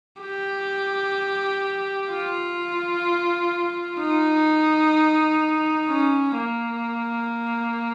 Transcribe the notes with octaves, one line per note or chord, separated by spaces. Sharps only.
G4
F4
D#4
C#4
A#3